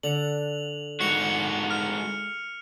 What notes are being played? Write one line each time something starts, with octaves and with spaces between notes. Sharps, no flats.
D3 F#5 F7 F#7
G#2 F#4 C#7 F7
F6